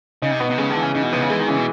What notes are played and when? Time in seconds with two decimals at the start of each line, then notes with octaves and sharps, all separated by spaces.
0.22 C#3 D#4
0.31 C3
0.40 B2 B3
0.50 C3
0.58 C#3 G#3
0.70 D3
0.76 E3
0.82 C#3
0.94 C#3 D#4
1.03 B2
1.13 C3 B3
1.21 C#3
1.30 E3 G#3
1.40 D#3
1.48 C#3 E3
1.57 B2